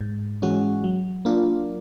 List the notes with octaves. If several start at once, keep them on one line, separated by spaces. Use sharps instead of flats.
G#2
E3 G#3 C#4 F#4
F#3
A#3 D4 F4